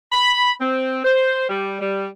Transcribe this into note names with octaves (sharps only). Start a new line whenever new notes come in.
B5
C4
C5
G3
G3